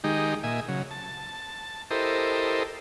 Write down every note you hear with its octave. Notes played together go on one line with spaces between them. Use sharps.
D#3 G#3 D#4 G4
A#2 D#5 E5 G#5
C#3 F#3
A5
E4 G4 A4 A#4 C5 D#5